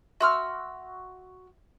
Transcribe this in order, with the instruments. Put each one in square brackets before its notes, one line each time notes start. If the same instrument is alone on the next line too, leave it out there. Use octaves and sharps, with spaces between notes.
[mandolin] F#4 E6 F6 [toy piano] E5 C6